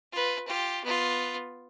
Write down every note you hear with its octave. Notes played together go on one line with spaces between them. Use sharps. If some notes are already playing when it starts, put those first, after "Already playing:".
F4 B4
F4 G4
B3 F4